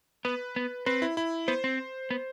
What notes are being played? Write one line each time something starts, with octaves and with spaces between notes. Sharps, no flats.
B3 B4
B3
C4 B4
E4
E4
B3 C5
C4
B3